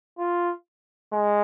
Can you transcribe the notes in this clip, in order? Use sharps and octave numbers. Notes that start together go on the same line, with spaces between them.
F4
G#3